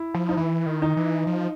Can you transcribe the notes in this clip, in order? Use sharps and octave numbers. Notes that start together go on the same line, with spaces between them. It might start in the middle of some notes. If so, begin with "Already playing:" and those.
Already playing: E4
F3
D#4
E3 E4
D#3
D#4
E3
F3